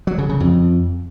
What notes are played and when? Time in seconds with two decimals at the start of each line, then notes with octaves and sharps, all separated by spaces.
0.07 F#3
0.18 C#3
0.29 C#3
0.40 F2